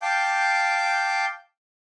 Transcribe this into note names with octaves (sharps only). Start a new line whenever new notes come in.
F5 G5 A5 D6 G6